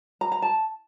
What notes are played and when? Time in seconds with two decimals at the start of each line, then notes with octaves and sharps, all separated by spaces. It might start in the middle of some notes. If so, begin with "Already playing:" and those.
0.21 A#5
0.32 A#5
0.42 A5